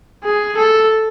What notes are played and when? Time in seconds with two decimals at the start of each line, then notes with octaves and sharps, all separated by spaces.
0.25 G#4
0.57 A4